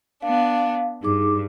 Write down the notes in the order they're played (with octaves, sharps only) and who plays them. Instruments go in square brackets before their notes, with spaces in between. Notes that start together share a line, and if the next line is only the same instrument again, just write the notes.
[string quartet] B3 D4 [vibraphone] F5
[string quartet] G2 [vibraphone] D#4 G#4 D6